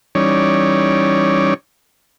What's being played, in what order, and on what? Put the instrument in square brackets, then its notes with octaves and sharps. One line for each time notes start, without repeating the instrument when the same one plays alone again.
[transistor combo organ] E3 G3 C#4 D#4 C#5 D5